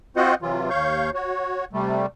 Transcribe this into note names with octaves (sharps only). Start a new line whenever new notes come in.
C4 F4 F#4 C5 D#5 F#5
C3 E3 F#3 F4
D#2 C#5 F5 C#6 G6
F#4 C#5
C3 G3 A3